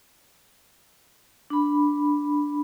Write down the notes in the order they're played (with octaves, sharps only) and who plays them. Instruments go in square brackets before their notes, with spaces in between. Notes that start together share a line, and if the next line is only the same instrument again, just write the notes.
[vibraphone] D4 B5